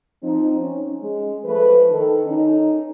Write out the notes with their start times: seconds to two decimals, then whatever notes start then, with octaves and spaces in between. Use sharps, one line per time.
0.22 F3 C4 D#4
0.59 C#4
0.99 G#3
1.44 F3 A3 B4
1.89 D#3 A4
2.26 C#4 D#4